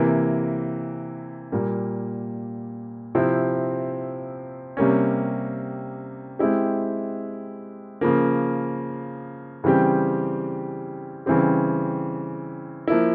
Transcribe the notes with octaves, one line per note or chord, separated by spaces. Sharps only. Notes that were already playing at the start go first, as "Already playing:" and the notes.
Already playing: C3 E3 A#3
A#2 G3 A#3
C3 F3 C4 E4
C3 G3 A#3 C#4
G#3 C4 E4 G4
C#3 F3 A#3
C#3 E3 G3 C4 G4
C#3 E3 G3 C4 G4
F3 A#3 E4